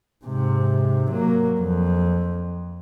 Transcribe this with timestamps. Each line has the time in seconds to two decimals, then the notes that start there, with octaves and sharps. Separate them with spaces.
0.25 G#2 C3
1.11 F#3 A#3
1.60 F2